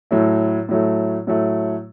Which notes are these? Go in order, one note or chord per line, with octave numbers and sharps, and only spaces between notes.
A2 F#3 A3
A2 F#3 A3
A2 F#3 A3